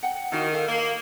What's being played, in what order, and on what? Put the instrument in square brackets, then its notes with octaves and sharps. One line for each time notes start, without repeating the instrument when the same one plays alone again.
[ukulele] F#5 G5
[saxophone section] D#3 [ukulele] E4 F#4 F5
[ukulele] A4 F5
[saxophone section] A#3